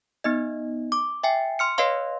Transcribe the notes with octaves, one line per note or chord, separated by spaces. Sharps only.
B3 D#4 D#5
D6
E5 G5 G#5
C6 F6 C#7
B4 C#5 D#5 F5 C6